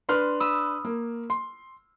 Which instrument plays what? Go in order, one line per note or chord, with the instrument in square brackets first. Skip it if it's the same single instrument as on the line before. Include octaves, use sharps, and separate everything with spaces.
[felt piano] D4 B4 F6 [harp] C6
[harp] B5 D#6 E6
[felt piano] A#3
C6